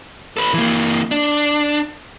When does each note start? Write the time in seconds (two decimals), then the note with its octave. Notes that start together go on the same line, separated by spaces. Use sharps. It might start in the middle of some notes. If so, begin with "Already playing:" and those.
0.37 A4 B4
0.54 E3 A#3
1.11 D4